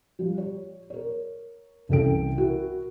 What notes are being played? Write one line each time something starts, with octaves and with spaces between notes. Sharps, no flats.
F3 G3
C#5
A#4 C#5
C2 E3 C#4 A4 G5 D7
E4 F#4 A#4